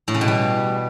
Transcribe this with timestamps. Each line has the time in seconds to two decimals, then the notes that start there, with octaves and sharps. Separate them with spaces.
0.08 A2
0.14 C#3
0.21 B2
0.28 G3